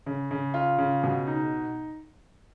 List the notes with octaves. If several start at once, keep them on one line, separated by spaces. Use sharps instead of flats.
C#3
C#3
F4
C#3
B2
D#4